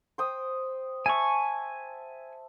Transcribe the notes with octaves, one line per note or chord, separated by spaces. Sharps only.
C5 G5 D#6
E5 G#5 A5 C#6